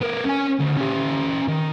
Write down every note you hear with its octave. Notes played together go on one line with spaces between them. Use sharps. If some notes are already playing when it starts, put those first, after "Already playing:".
B3 A#4
C#4 G#5
D2
C#4 G4
D#3